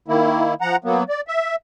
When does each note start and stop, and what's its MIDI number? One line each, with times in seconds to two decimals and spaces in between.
0.08 0.54 51
0.08 0.54 58
0.08 0.54 64
0.61 0.76 53
0.61 0.76 78
0.61 0.76 82
0.84 1.04 54
0.84 1.04 58
0.84 1.04 59
1.09 1.21 74
1.28 1.55 76